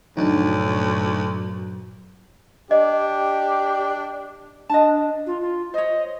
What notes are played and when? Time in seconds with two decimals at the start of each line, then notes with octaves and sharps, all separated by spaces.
0.17 D2 G2 A#2 F#3 D4 D#4
2.71 D4 G4 D#5
4.70 D4 D#5 A5
5.27 F4
5.41 F4
5.74 C5 C#5 D#5